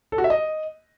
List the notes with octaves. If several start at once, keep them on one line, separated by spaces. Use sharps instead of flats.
A4
F#4
E5
D#5